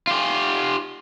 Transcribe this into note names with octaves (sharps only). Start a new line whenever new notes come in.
F4 G4